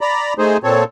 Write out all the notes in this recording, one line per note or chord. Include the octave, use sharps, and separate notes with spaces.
D5 A#5 B5
A3 D#4 G#4 C5
A#2 C4 A4 C#5